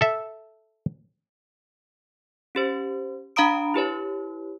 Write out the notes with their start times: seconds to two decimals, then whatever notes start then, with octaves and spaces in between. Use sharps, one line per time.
0.01 A4 E5
2.55 C#4 G4 C5
3.36 D4 F5 A#5 B5 D#6 D7
3.74 E4 G4 B4 C#5